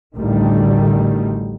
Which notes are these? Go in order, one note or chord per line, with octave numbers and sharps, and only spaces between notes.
A1 D2 D3 D#3 G3